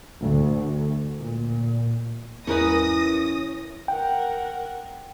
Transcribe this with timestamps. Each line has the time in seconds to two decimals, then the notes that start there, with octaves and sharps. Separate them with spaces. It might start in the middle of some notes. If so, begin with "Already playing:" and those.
0.21 D2
1.19 A#2
2.47 E2 G#2 E3 C#4 A#4 B4 D#6 A#6
3.88 A#4 F#5 G5